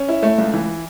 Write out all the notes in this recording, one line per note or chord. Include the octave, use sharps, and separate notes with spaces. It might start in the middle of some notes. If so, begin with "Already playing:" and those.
Already playing: C#4
E4
A3
C#2
E3